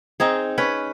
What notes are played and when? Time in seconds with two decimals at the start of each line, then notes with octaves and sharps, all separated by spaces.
0.20 C4 D#4 G#4
0.58 C#4 B4